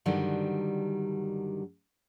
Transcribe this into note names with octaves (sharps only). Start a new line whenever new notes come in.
G2 D3 D#3 F#3 G3